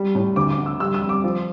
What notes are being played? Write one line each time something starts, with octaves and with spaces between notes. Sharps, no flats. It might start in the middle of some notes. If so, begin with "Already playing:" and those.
Already playing: G3
A2
D2 D6
D6
D3
E6
G3 E6
E6
G3
D6
F3